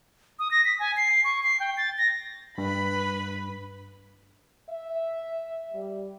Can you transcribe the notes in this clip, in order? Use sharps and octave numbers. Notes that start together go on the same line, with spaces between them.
D#6
A#6
B6
G#5
C7
C#6
C7
G5
A6
A#6
G2 B4 B5
E5
G3